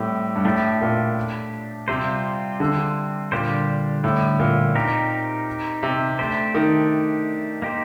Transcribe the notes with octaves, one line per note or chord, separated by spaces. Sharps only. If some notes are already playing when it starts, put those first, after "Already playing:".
Already playing: A2 G3 C4 G4
G2
A2 A3 D4 G4
A#2
C3 G3 C4 F4 C5
D3
A#2 D3 G3 D4 G4 C5
A2
A#2
C4 D#4 G4 A#4
C3
A3 D4 G4 C5
D#3
A#3 D#4 G4 C5